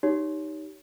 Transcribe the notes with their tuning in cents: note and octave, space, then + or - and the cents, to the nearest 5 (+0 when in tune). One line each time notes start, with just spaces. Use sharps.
D#4 +0 G4 -20 C#5 +20